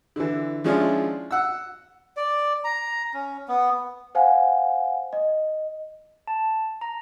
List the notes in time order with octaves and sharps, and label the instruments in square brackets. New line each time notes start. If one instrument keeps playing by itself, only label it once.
[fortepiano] D3 E3
F3 G#3 C#4 D4 E4 F4
F#5 E6
[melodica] D5
A#5
C#4
B3
[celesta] C5 F5 F#5 G#5
D#5
[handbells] A5
A#5